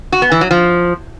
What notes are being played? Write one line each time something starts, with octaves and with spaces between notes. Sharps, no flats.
F#4
B3
E3
F#3
F3